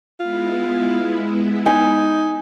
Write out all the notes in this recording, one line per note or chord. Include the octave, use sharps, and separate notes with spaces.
G#3 B3 E4 F4
D#4 G#5